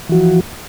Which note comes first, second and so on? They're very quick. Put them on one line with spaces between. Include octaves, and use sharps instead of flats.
E3 F#4 F3